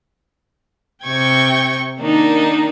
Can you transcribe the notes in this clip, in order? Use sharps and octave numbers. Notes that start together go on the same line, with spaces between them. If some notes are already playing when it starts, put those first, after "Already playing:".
C3 G5 C#6 G#6
D#3 A#3 D4 D#4